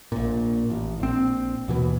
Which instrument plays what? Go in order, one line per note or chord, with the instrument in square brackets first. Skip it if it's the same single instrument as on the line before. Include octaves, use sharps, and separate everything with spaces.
[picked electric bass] A#1 A#2
A1
A#1 C4
D#2 B2 E3